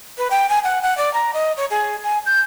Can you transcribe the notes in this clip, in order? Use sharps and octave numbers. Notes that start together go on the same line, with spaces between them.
B4
G5
G#5
F#5
F#5
D5
A#5
D#5
C#5
G#4
G#5
G6